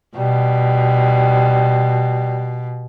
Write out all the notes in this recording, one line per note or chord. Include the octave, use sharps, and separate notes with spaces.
B2 G3